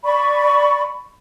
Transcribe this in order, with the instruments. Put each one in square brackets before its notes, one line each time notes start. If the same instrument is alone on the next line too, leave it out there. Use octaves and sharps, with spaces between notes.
[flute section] D5 B5 C#6